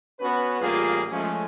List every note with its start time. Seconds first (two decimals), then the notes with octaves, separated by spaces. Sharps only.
0.20 B3 C#4 F#4 B4
0.61 A1 G3 A#3 F4 G#4
1.11 F3 G#3 A3 C#4